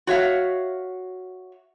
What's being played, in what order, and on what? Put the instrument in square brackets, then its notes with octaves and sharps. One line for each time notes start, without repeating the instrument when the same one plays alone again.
[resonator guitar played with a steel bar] F#4 C#5 E5 F5